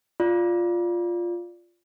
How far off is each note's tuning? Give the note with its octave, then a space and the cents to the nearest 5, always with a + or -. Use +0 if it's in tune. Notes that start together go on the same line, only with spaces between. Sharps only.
F4 +0 D5 +0